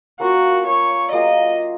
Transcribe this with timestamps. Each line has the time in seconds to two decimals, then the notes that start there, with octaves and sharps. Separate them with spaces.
0.20 A#3 C#4 F4 F#4 A#4
0.66 C#5
1.12 F#3 A#3 F4 G#4 D#5